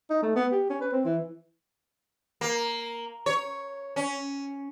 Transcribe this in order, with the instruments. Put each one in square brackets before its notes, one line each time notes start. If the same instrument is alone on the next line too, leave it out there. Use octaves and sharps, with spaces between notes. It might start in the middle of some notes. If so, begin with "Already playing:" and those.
[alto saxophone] D#4
A3
B3
G4
C#4
B4
C4
E3
[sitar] A#3
C#5
C#4